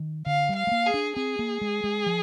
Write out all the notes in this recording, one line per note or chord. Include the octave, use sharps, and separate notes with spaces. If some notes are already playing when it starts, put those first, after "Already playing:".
Already playing: D#3
D3 F5
G3
F5
G#3
A#3
G#4
D4
C4 G#4
A#3
G#3
G#3
F3